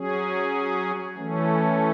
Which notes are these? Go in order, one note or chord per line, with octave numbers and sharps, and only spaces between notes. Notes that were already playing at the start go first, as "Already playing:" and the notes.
Already playing: F#3 C#4 G#4
E3 A3 C#4